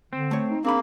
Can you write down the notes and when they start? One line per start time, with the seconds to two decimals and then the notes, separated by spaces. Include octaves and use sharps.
0.13 D3 C4
0.31 A3 C#5
0.50 D#4
0.65 A#3 C4 D4 G#4 B5